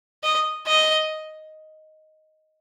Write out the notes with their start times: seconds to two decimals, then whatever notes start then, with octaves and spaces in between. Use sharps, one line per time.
0.23 D#5
0.67 D#5